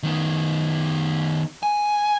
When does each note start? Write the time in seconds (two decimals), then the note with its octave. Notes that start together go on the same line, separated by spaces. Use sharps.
0.03 D#3 B3
1.63 G#5